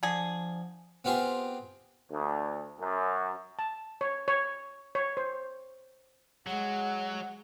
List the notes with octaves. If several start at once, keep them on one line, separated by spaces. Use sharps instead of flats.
D3 F3 G#4
B3 C4 F4 G4 G#4
D2
F#2
A5
C#5
C#5
C#5
C5
F#3 G#3 F#5